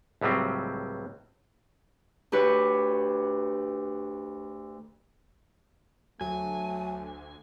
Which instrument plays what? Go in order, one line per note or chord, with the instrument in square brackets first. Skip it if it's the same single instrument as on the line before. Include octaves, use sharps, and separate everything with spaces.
[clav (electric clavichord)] C#2 A2 F#3 G3 C4
[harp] D2 F#4 G4 B4 C#5
[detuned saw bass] D2 [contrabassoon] F#3 [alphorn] A3 [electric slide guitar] G#5